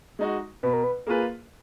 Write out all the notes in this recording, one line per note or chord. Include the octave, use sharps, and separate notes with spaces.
G#3 D#4 F#4
B2 B4
A#4
B4
A#3 F4 G#4 B4